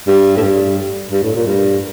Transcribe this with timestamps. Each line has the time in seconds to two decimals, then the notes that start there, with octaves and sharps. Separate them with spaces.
0.07 G2
0.37 A2
0.42 G2
1.11 G2
1.23 A2
1.35 A#2
1.47 G2